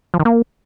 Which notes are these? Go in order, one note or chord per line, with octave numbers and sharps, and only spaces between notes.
F3
D#3
A#3